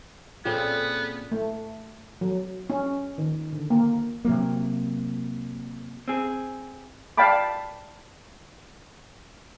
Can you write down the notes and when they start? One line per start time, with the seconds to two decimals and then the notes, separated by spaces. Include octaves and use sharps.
0.45 A#2 C#3 B3 C4 A4
1.32 A3
2.21 F#3
2.70 C#4
3.18 D#3
3.53 D3
3.70 A#3
4.25 C3 F#3 A#3
6.08 C4 G#4
7.17 D5 F5 G5 A5 B5 D6